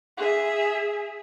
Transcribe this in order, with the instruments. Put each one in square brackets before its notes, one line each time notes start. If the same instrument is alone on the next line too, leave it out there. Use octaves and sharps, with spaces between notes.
[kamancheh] G#4 E5